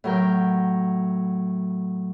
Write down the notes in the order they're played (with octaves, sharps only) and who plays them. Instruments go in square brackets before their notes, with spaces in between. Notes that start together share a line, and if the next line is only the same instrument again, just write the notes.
[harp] A2 F#3 A#4 G5